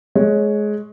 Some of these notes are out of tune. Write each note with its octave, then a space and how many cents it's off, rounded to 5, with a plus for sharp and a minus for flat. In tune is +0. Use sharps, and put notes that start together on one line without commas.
G#3 +20 C#5 +0